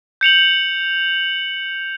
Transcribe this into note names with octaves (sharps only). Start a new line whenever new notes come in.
G6 C#7 F7 F#7